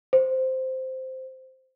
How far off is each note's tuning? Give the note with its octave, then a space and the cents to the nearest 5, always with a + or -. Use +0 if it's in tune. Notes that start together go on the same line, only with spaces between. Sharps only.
C5 -5